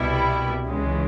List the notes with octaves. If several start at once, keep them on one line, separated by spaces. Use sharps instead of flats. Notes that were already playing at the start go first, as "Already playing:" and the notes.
Already playing: C2 B2 G3 B3 E4
C#2 C#3 E3 G#3